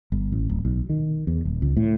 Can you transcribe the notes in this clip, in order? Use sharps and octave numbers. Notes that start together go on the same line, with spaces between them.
G1
A1
D1
B1
D#3
E2
D#1
C#2
A2